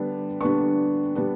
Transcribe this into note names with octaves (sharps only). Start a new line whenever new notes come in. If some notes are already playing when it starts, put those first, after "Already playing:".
Already playing: D3 G3 B3 D4
D3 G3 B3 D4 C#6
D3 G3 B3 D4